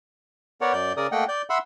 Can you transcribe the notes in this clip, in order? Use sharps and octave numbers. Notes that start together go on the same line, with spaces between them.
B3 A#4 C#5 D5 F#5
F#2 D5 G6
C#3 A#4 D5 D#6
A3 A#3 D#5 F#5 G5
D5 G6
E5 F#5 B5 C6 E6